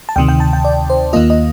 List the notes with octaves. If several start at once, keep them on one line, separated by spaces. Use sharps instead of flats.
A5
D2 C3 D#3 G5
G5
A5
G5
D5
C5
D#2 D#3 A#3 F4 D#5
D#5